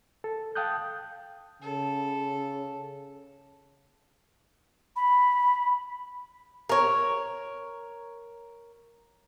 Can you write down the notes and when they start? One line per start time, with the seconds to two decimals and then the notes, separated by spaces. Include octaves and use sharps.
0.24 A4
0.55 F5 G5 A5 D#6 F#6 G6
1.62 C#3 A4
4.96 B5
6.69 A#4 C#5